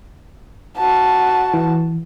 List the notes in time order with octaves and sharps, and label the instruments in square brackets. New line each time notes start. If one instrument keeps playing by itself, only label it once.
[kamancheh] F#4 A5
[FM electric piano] E3